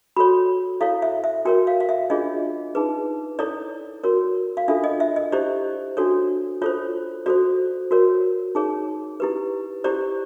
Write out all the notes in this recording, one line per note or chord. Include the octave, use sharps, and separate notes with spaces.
F#4 A4 C#5 B5
E4 A4 C#5 F5
E5
E5
F#4 A#4 C#5 G5
F5
F5
E5
D4 F4 G#4 C#5 D#5
D#4 G#4 B4
E4 A4 C#5 D5
F#4 A#4 C#5
F5
D4 F4 A4 E5
D#5
E5
D#5
E4 G4 C5 D5
D4 F#4 A4 C#5
F4 A4 C5 C#5
F#4 A4 C5 D5
F#4 A#4 C#5
D#4 G#4 C#5
E4 G4 B4
E4 G4 C5 D5